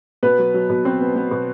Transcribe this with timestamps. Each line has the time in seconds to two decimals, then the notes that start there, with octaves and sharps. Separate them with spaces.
0.23 B2 B3 B4
0.38 F#3
0.54 F#3
0.70 B2
0.85 F#3 C4 C5
1.01 B3
1.16 B3
1.31 B2